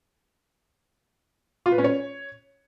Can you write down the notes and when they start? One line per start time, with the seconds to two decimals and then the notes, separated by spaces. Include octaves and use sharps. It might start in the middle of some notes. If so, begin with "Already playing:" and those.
1.66 F4
1.72 B4
1.78 C#4
1.84 C#5